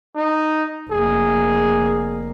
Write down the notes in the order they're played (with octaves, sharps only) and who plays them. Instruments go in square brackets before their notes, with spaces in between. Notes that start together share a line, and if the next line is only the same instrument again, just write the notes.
[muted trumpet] D#4
[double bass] F1 A#3 [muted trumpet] G#4